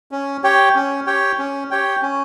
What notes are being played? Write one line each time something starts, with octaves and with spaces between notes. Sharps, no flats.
C#4
G4 C#5 G5
C#4
G4 C#5 G5
C#4
G4 C#5 G5
C#4